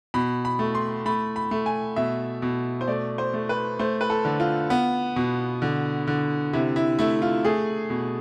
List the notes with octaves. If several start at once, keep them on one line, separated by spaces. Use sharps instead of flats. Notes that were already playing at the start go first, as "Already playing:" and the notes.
B2 B5
B5
A3
C6
A3 B5
B5
A3
G#5
B2 E5
B2
C5
A3 D5
C5
A3
B4
A3 C5
B4
A4
D3
F4
B3
B2
D3
D3
C3 E4
E4
A3 E4
F4
A3 G#4
B2